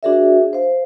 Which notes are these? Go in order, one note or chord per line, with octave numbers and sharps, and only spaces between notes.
D4 F#4 G#4 A#4 D5 E5
C5 F5